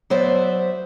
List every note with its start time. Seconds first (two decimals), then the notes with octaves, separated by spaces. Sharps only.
0.10 F#3 B3 C5 D5 E5